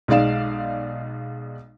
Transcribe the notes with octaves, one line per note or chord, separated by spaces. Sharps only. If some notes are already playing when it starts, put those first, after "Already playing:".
B1 G#3 D#4 D5 F5 E7